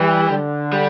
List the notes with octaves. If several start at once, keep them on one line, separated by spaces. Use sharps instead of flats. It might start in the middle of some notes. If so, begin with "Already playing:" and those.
Already playing: E3 G3
D3
G3